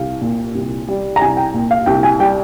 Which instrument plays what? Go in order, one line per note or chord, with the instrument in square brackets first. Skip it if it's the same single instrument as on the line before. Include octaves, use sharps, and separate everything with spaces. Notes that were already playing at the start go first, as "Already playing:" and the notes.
Already playing: [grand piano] C2 F5
A#2
C2
G3
A#5
C2 G#5
G5
A#2
F5
C2 G5
G#5
G3 G5